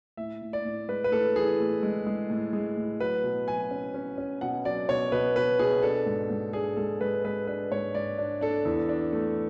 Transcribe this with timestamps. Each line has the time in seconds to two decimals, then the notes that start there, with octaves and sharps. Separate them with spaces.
0.17 A2 E5
0.42 A2
0.53 D5
0.65 A2
0.89 G#3 B4
1.04 B4
1.12 A2 A4
1.35 E3 G#4
1.59 A2
1.83 G#3
2.06 G#3
2.30 A2
2.53 G#3
2.76 A2
3.00 F#3 B4
3.24 B2
3.48 F#3 G#5
3.71 C#4
3.94 C#4
4.18 C#4
4.41 B2 F#5
4.65 F#3 D5
4.89 B2 C#5
5.12 B2 B4
5.36 B2 B4
5.59 B2 G#4
5.83 D4 A4
6.06 G#2
6.30 G#2
6.53 D4 G#4
6.76 G#2 A4
7.01 G#3 B4
7.24 G#3 B4
7.47 D4 B4
7.71 G#2 C#5
7.95 G#2 D5
8.18 D4
8.41 D4 A4
8.65 E2
8.89 D4
9.13 A3